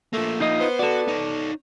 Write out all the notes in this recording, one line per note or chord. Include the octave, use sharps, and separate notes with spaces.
F3 A3 A#3
D#4 F4 D#5
B3 C5
F#4 A4 D5
D#4 C#5